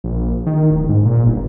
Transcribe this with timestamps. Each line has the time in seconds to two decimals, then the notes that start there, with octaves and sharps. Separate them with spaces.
0.04 A#1
0.46 D#3
0.71 D1
0.89 G#2
1.05 A#2
1.26 G1